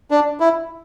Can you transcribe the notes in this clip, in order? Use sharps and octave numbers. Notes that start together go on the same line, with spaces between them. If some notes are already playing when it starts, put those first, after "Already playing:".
D4
E4